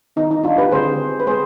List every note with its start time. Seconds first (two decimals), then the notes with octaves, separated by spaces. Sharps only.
0.16 D#3 B3 D#4
0.31 D#4
0.44 D4 F4
0.58 G4 B4
0.72 D3 G#3 C4 G#4 C5
1.20 B4
1.27 G#3 B3 G#4 C5